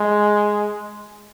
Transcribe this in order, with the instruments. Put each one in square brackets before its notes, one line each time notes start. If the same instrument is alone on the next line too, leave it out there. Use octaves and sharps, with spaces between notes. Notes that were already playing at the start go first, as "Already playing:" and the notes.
Already playing: [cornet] G#3